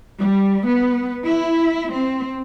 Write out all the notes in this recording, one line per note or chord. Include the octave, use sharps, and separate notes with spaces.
G3
B3
E4
C4